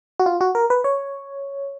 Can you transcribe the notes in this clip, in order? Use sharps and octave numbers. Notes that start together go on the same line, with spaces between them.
F#4
F4
F#4
A#4
B4
C#5